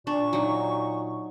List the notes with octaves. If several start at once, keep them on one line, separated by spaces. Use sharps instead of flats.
A#2 D4 C#6
F#3 D#4